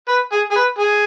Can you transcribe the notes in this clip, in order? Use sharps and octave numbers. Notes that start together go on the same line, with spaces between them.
B4
G#4
G#4
B4
G#4